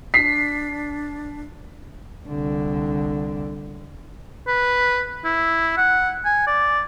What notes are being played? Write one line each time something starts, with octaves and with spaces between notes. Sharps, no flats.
D4 B6 C7
C2 D3
B4
E4
F#5
G#5
D5